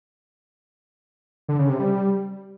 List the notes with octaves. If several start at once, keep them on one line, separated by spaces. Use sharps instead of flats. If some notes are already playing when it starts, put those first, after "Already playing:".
D3
C#3
C3
G3